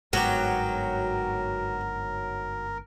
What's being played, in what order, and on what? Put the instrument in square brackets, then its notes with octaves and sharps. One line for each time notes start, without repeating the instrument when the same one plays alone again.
[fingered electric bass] G1 G#2 [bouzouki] F#3 [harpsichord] B3 F#4 G4 [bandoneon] A#4